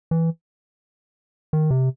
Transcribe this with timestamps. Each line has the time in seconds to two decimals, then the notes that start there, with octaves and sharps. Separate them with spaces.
0.11 E3
1.53 D#3
1.71 C3